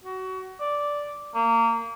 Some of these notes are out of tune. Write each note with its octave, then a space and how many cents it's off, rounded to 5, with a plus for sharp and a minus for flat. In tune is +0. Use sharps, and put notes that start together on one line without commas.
F#4 +25
D5 -5
A#3 -25